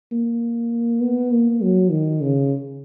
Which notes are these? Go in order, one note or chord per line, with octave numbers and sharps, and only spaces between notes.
A#3
B3
A#3
F#3
D#3
C#3